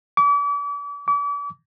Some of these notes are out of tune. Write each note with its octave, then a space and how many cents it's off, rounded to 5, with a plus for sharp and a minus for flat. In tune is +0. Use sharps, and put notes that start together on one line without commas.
D6 -40
D6 -40